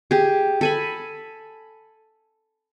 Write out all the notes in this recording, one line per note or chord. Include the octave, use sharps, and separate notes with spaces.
G4 G#4
A4 G#5 B5